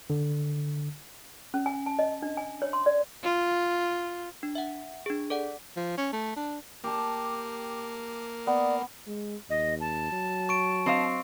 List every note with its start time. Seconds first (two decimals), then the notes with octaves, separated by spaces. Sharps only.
0.10 D3
1.54 C#4
1.66 G#5
1.86 A5
1.99 D#5
2.22 D4
2.37 G#5
2.62 C#5
2.73 C6
2.86 D5
3.23 F4
4.43 D4
4.55 E5 F#5
5.06 D4 G#4
5.30 A4 D5 F#5
5.76 F3
5.98 C#4
6.13 A3
6.36 D4
6.84 A#3 G4 A5
8.47 B3 D5
9.07 G#3
9.49 D#2 D#5
9.80 A5
10.12 F#3
10.49 C#6 D7
10.86 C4 D#5 F5